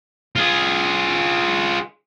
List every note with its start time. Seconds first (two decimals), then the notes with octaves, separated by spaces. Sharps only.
0.36 F4 G#4